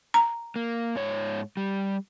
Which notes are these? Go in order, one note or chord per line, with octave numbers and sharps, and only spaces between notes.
A#5
A#3
G#2 C#5
G3